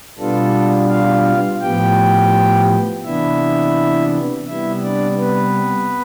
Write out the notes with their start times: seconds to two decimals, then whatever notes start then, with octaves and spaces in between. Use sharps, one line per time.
0.18 B2 G3 B3 D4 F4 A4
0.89 F4 F5
1.61 A2 F3 B3 G4 G5
3.04 C3 E3 B3 D4 E4 E5
4.47 C3 G3 B3 E4 E5
4.83 D4 D5
5.19 B3 B4